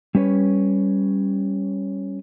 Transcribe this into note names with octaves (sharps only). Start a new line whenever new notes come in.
G3 C#4 B4 C#5